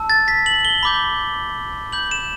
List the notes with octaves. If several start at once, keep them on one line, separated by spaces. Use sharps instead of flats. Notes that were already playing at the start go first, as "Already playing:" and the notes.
Already playing: A5 E6
A6
B6
F#7
G7
B5 D6 G6
B5 D6 G6 F#7
E7